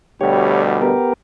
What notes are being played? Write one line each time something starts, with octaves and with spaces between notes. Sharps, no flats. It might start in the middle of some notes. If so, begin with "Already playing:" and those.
D2 B2 G3 G4 C#5
B3 G4 A#4